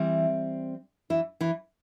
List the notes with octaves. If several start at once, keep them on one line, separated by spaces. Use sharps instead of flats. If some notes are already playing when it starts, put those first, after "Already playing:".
Already playing: E3 G3 C4
E3 E4
E3 E4